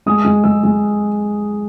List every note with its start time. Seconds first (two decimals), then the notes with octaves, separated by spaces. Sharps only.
0.06 G#3 D#6
0.25 G#3
0.44 G#3 E6
0.63 G#3